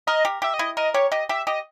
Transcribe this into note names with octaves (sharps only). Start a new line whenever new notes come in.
A#4 D#5
G4
G4 E5
D#5
E4
A#4 D#5
G4 C#5
G4 D#5
G4 E5
G4 D#5